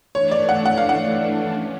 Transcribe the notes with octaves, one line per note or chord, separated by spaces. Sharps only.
E3 A3 D4 C#5
D5
F#5
F#5
F5
F#5
C#4